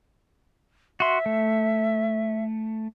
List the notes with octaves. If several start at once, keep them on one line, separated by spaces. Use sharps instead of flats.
F#4 E5 C6
A3